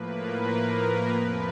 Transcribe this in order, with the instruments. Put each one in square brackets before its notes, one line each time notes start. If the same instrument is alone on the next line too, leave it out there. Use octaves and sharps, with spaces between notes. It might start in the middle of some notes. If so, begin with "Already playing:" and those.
Already playing: [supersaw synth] A2 F3 A#3 B4
A#4
F2 C3 F3 B4